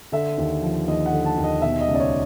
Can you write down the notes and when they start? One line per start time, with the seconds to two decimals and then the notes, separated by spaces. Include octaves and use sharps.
0.12 D3 E5
0.38 D#2
0.63 F3
0.88 D#2 D#5
1.06 F#5
1.13 D3
1.25 A5
1.37 D#2
1.44 D#5
1.62 B2 E5
1.81 D#5
1.88 C#2
1.95 D5
2.00 C#5